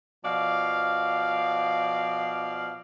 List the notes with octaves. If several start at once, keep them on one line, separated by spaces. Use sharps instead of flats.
B2 F3 D5 F5